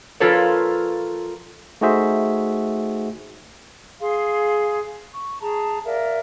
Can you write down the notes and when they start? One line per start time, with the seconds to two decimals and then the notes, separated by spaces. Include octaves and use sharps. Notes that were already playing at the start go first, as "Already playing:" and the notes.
0.20 F3 A#3 F4 A4 B4 C#5
1.81 A3 D#4 F#4 G#4 C5 E5
4.00 G#4 F5 C6
5.14 C#6
5.41 G#4 A5 A#5
5.85 A#4 D5 E5 F5